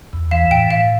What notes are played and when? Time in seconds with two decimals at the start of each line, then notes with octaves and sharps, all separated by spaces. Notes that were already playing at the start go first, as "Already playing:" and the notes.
0.13 E2
0.31 E3 F5
0.51 A2 G5
0.71 A2 F5